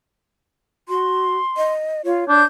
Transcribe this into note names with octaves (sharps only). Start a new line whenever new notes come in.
F#4 C6
D#5
F4 C#5
D4 G6